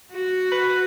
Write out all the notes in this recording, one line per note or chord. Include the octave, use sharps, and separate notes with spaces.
F#4
B4